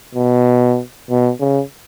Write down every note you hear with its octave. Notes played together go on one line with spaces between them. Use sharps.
B2
B2
C#3